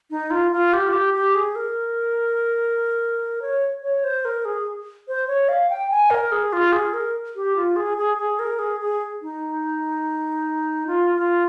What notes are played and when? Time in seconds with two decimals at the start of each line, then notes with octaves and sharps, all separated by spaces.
0.11 D#4
0.31 F4
0.51 F4
0.73 G4
0.88 F4
0.93 G4
1.13 G4
1.35 G#4
1.56 A#4
3.42 C#5
3.83 C#5
4.04 C5
4.25 A#4
4.45 G#4
5.08 C5
5.28 C#5
5.49 F5
5.70 G5
5.91 G#5
6.10 A#4
6.32 G#4
6.53 F4
6.73 G#4
6.94 A#4
7.36 G4
7.56 F4
7.76 G#4
7.98 G#4
8.17 G#4
8.39 A#4
8.59 G#4
8.81 G#4
9.22 D#4
10.87 F4
11.15 F4